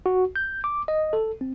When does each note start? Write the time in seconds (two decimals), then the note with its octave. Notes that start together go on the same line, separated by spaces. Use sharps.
0.06 F#4
0.36 G6
0.64 D6
0.88 D#5
1.13 A4
1.41 C4